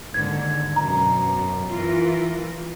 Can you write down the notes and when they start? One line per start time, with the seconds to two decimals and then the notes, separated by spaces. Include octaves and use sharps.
0.14 D#2 G#2 D3 G#6
0.76 F#2 B2 A#5
1.70 E3 F4 A#4